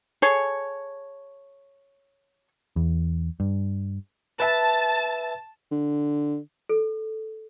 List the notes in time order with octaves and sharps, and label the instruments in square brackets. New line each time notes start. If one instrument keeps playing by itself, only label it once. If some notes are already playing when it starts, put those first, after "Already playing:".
[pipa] G#4 A4 C#5
[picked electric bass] E2
G2
[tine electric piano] B4 E5 A6 [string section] A5
[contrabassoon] D3
[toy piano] A4